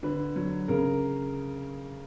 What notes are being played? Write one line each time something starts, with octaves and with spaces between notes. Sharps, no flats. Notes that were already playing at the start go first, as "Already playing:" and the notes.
D3 B4
F#3
C#3 A#4